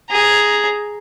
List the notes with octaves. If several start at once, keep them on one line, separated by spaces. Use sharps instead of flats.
G#4 A#5